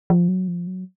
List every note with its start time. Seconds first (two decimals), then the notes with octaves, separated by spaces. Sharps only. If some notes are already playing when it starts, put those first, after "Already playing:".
0.10 F3
0.29 F#3
0.48 F3
0.67 F#3